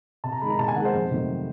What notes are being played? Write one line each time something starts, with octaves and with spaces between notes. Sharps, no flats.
C3 A5
A#5
D#3 G#3 B5
A#5
C3 A5
G#5
D#3 G#3 F#5
C5
F2
C3 D#3 F#3 A3